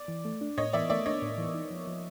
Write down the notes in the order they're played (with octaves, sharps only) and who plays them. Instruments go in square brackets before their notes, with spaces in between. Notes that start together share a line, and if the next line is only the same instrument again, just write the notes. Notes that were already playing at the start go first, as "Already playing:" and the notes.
Already playing: [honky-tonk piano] D5
[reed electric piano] E3
A3
D4
[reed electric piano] A2 [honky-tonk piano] C#5 D#5
[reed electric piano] E3 [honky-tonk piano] D5 E5
[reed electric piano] A3 [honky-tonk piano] D5 E5
[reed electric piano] D4 [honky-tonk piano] C#5 D#5
[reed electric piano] A2
E3
D#4
F3
F3